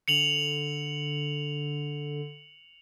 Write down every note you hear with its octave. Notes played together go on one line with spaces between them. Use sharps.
D3 C#7 F7 F#7